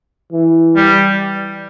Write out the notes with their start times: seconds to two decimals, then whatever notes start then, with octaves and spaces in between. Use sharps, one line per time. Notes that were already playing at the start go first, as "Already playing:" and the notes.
0.32 E3
0.76 G3